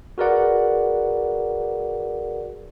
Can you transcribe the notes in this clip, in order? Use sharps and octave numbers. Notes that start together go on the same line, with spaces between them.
F#4 G#4 A#4 B4 D5 F#5